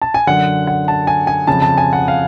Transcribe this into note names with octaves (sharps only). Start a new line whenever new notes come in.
A5
G#5
F#2 D3 F#5
F#5
A5
G#5
G#5
F2 C#3 A5
A5
G#5
F#5
F5